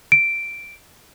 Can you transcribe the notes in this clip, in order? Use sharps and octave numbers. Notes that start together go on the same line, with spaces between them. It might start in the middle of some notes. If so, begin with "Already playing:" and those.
D7